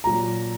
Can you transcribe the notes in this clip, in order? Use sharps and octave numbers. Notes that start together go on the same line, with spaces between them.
A#2 F#3 A#5